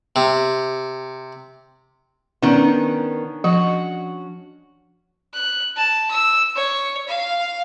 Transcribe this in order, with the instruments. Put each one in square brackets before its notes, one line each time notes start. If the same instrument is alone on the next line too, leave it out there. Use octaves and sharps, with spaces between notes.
[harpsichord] C3
[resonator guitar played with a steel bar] D#3 B3 [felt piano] C#4 D4
[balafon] F3 [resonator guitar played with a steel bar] F#4
[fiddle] F#6
A5
E6
C#5
F5